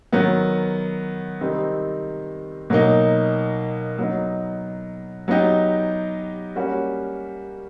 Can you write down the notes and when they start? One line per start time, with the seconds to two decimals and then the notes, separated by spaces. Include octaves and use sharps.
0.13 D#3 F#3 B3
1.41 C3 D#3 G3 C4 D#4
2.70 B2 F#3 A#3 D#4
3.98 F#3 B3 D#4
5.28 F#3 B3 D#4 G4
6.56 G3 A#3 C#4 F#4